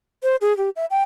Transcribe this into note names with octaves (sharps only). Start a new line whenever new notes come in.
C5
G#4
G4
E5
G5